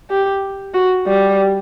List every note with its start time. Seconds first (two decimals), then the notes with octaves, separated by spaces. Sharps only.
0.10 G4
0.74 F#4
1.06 G3